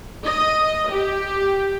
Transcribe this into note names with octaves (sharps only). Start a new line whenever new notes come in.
D#5
G4